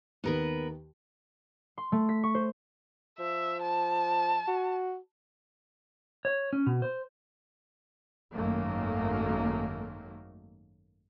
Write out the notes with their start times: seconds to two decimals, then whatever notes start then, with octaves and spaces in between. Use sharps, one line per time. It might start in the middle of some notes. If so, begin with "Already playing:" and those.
0.24 D#2 D#3 B3 A#4 B4
1.78 C6
1.92 A3
2.09 B6
2.23 C#6
2.35 C5
3.19 F3 E5
3.62 A5
4.48 F#4
6.25 C#5
6.53 C#4
6.67 B2
6.82 C5
8.35 G#1 F#2 D#3 F#3 A3 A#3